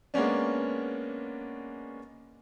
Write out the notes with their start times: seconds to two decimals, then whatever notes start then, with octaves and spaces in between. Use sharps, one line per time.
0.14 G#3 A#3 B3 C#4 D4